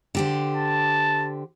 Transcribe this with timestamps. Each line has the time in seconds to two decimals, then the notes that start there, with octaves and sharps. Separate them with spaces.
0.15 D3 G4 C5
0.57 A5